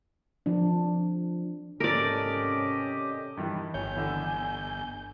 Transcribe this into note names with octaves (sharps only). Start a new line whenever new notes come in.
F3 D4
G#1 C3 C#4 G4 A4 A#4 D5 D#5
G2 D#3 E3
G1 C#5 G#5 G6
D3 E3